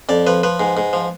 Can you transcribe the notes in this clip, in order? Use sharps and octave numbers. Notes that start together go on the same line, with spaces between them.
F2 D5
F3 B4
F3 B4
G#2
G#2
F3